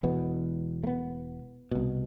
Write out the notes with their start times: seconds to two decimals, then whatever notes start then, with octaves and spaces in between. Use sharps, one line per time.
0.03 E1 E2 B2 B3
0.84 A3
0.87 B3
1.71 C2 B2